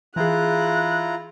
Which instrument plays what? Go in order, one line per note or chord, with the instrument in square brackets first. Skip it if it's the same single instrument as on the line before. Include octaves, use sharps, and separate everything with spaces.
[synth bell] E3 G#4 [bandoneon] E4 F4 A#5 [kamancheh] F#6